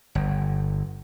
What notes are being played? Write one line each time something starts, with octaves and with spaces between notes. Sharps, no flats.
G1